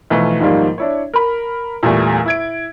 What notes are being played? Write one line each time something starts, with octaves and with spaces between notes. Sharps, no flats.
B1 E3 F3 A3
G#2 D#3 F3 G3 A#3
D4 E4 C#5
A#4 B5
E2 A#2 G3 A3
E4 G#6 D7